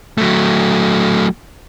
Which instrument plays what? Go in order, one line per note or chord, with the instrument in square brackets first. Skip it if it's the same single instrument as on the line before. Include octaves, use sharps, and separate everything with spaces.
[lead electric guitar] F#3 A3